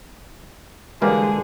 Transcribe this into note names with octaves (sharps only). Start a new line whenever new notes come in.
D3 E3 G3 G#3 A#3 G#4 A4 D5